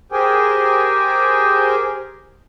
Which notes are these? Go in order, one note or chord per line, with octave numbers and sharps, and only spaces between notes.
G4 G#4 A#4 C5 G5 G#5